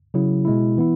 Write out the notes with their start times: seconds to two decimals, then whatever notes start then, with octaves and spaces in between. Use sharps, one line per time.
0.14 C#3 F#3 E4
0.45 B2 G#3 E4
0.78 E3 B3 E4